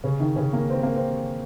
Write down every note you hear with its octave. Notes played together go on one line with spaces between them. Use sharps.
C#3 C#4
D#3 D#4
C#3 C#4
A#3
C4
A#3
C4